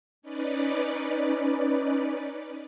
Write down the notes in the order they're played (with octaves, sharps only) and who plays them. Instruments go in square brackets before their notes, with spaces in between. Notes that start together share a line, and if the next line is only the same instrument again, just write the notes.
[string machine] C#4 D#4 B4 D5